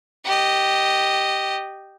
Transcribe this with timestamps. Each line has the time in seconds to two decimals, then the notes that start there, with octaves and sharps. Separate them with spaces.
0.25 G4 D#5